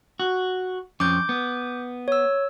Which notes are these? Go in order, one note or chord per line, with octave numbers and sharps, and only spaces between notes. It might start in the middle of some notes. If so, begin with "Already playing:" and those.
F#4
F2 C#4 D6 G6
B3
C#5 E6